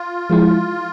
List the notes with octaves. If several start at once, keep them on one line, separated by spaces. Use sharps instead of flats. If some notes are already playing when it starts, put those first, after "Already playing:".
Already playing: F4
F3 G#3 E4